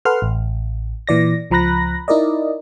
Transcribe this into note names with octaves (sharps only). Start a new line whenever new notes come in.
A4 B4 F#5 C6 F6
A1
A#2 E3 D5 A#6
C#2 F3 A#5 B5 F#6 A#6
D#4 E4 A#4 D5 D#5